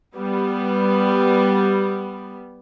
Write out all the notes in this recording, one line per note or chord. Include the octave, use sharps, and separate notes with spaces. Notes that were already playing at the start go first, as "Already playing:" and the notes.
G3 B3